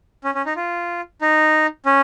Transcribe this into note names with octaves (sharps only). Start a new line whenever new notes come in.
C#4
C#4
D#4
F4
D#4
C#4